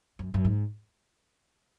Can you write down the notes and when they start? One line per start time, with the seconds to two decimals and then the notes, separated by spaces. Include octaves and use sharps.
0.19 F#2
0.34 F#2
0.45 G#2